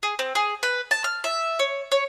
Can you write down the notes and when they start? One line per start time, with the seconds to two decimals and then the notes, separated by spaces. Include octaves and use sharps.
0.03 G#4
0.19 C4
0.35 G#4
0.63 B4
0.91 A5
1.04 F6
1.24 E5
1.59 C#5
1.92 C#5